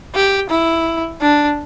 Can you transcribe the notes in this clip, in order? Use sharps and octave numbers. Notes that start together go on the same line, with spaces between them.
G4
E4
D4